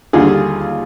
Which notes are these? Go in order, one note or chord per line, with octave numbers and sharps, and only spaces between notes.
D#2 D3 G3 F4 G#4